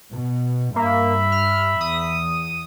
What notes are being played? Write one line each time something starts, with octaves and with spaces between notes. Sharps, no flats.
B2
G2 A#3 E5 B5
F6
E2 D#6